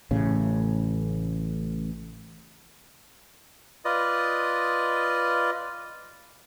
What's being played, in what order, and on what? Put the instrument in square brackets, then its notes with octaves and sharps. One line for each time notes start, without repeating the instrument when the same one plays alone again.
[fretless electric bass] A1 A2 C#3
[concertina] F4 B4 D5 D#5 D#6